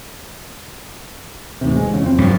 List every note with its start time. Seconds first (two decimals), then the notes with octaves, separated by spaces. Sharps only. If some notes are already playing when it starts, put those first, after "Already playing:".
1.61 A1 D#2 C3
1.77 G#3
1.89 E2 C#3
2.02 F2 C4
2.18 G2 F3 F#3